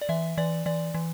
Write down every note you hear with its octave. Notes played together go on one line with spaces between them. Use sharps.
D5
E3 E5
E3 D5
E3 D5
E3